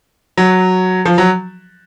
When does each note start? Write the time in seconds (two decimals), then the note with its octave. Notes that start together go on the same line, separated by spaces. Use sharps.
0.37 F#3
1.05 F3
1.18 F#3